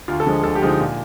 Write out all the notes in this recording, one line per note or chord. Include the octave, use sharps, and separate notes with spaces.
D2 F4
A4
D3 F3 G#3
D2 A4
G4
D3 F3 G#3 D#4
A#2